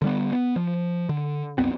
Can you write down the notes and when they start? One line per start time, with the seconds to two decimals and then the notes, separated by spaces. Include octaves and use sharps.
0.02 D3 G3 B3
0.32 B3
0.56 F3
1.09 D3
1.58 C2 F#2 B3 C4